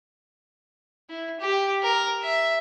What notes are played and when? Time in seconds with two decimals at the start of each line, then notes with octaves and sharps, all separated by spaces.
1.10 E4
1.40 G4
1.83 A#4
2.23 E5